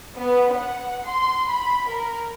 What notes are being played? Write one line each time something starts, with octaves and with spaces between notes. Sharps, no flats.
B3
F#5
C6
B5
A#4